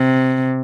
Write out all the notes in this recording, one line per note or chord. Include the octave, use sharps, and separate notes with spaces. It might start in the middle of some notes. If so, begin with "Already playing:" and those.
Already playing: C3